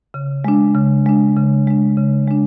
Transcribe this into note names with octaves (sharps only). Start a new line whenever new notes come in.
C#3
G#3 D4
C#3
G#3 D4
C#3
G#3 D4
C#3
G#3 D4